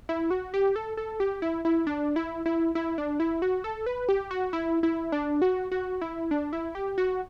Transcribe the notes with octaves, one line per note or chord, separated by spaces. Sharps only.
E4
F#4
G4
A4
A4
G4
E4
E4
D4
E4
E4
E4
D4
E4
F#4
A4
B4
G4
F#4
E4
E4
D4
F#4
F#4
E4
D4
E4
G4
F#4